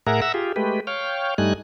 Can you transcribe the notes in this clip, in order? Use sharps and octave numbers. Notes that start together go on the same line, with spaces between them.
A2 G#4 A#4 E5 F#5 A#5
E5 F#5 A#5 E6
F4 G4 G#4
G#3 A3 G4 B4
C#5 F5 G5
G2 G3 A3 D#4 G#5 F#6